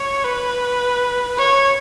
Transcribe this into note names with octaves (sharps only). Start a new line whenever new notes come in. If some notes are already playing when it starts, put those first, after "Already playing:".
Already playing: C#5
B4
C#5